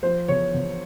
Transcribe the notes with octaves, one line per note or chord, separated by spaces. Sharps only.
F3 C5
E2 C#5
E2